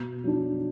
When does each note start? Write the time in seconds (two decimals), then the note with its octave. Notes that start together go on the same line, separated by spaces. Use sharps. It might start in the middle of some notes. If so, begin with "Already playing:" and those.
Already playing: B2
0.24 F#3 D4